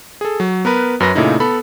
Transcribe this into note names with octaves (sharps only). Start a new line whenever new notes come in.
G#4 A4
F#3
B3 A#4 B4
F#2 C#4 B4 A#6
A#2 C#3 A3 D#4 E4
B3 A4 B5